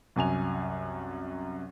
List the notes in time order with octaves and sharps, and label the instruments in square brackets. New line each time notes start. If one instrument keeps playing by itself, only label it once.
[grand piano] C2 F#2 G#5 F7